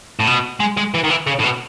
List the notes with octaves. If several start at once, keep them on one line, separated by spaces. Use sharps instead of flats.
A2
B2
G#3
G#3
E3
D#3
E3
C#3
A2
B2